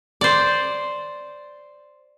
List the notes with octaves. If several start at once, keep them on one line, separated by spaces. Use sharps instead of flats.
C5 D5